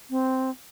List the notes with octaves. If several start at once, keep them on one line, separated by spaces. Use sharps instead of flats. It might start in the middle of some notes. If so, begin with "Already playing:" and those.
C4